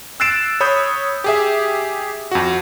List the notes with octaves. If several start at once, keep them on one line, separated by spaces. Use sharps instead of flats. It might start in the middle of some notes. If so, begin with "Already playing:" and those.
E6 F#6 A6 C7 D7 E7
C#5 B5 D#6 G6
G4 G#4 E5
F2 F#4